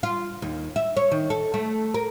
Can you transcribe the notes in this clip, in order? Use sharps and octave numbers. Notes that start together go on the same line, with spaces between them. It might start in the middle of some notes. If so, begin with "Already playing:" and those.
F4
D#2
E5
C#5
D#3
A4
A3
A#4